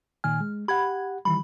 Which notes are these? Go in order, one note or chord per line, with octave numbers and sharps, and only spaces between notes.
A#2 D#3 G#5 F6
G#3
G4 F#5 B5 G#6
D#3 E3 G3 B5